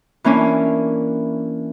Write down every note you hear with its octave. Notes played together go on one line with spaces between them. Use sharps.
E3 A#3 C#4 D4